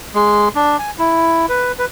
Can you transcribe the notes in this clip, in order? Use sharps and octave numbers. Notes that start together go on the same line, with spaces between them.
G#3
D4
G#5
E4
B4
B4